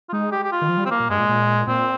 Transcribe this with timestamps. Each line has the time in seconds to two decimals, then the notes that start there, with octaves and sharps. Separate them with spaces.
0.09 F4
0.13 G#3 D#4
0.32 G4
0.44 G4
0.52 F4
0.62 D#3
0.69 F3
0.77 G3
0.86 C4
0.91 F3 A#3
1.00 A#2
1.09 G2 G#3
1.19 A#2
1.29 A#2
1.67 A#2 C4